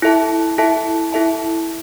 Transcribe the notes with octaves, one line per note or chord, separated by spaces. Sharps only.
E4 A4 E5 A5
E4 A4 E5 A5
E4 A4 E5 A5